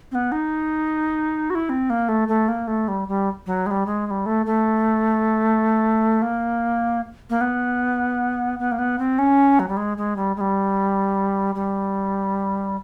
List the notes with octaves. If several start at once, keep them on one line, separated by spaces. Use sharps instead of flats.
C4
B3
D#4
F#4
E4
C4
A#3
A3
A3
A#3
A3
G3
G3
F#3
G#3
G3
G#3
G#3
G3
A3
A3
A#3
A#3
B3
B3
A#3
B3
C4
C#4
F#3
G3
G#3
G#3
G3
G#3
G3
G3